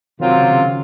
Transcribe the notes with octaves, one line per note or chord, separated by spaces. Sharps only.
C3 D#3 F#3 C4 F4
C#3
C#3